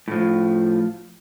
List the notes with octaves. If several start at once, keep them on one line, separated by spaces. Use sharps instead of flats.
A2 F3